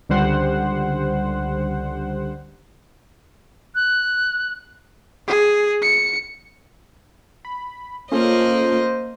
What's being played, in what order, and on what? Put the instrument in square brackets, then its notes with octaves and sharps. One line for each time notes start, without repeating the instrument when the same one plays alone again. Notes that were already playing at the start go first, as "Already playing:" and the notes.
[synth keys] C#2 D3 G3 C5 F#5
[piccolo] F#6
[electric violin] G#4
C#7
[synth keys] B5
[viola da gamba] A#3 D#5 [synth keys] C#4 F4 A4 [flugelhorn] C5